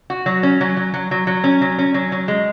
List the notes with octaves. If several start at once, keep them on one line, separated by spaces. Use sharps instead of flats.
F#4
F#3
C#4
F#3
F#3
F#3
F#3
F#3
C#4
F#3
C#4
F#3
F#3
G#3